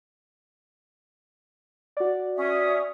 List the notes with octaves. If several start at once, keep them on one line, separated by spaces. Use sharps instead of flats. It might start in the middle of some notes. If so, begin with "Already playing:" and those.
F#4 D5
C#4 E5 D#6